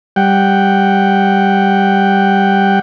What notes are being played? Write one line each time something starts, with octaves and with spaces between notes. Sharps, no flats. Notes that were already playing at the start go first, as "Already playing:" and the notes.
G3 F#5 G5